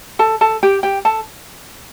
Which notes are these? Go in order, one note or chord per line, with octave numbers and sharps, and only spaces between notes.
A4 A5
A4 A5
G4 G5
G4 G5
A4 A5